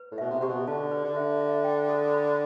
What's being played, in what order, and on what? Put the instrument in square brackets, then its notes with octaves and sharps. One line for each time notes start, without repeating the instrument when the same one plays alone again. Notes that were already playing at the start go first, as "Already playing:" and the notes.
Already playing: [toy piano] B4
[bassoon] A2
[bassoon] B2 [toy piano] E5
[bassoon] C3
[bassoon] C3 [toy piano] G4
[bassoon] B2
[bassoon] D3 [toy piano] A5
[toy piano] B4
[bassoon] D3
[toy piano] E5
E5
G5
A4
B5